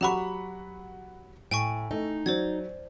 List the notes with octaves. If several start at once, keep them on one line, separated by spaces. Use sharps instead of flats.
F#3 G4 F#5 A#5 B5 C#6
A2 G5 G#5 C#6
A3 D#4
F#3 C5 D5 G#6